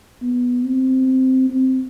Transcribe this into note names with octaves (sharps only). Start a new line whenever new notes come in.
B3
C4
C4